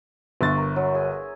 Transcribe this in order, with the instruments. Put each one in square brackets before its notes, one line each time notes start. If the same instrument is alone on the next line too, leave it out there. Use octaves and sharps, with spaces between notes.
[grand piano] G1 A6 [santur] E5 C6 C#6
[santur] A#4
F#3
G#4